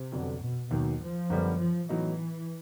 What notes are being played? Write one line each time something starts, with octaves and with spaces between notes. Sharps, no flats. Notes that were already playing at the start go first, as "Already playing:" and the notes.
Already playing: C3
F2 D3 F#3 B3 D4
B2
D#2 B2 D#3 F#3
F3
F#2 D3 G3 B3
F3
A2 E3 F#3 B3 D#4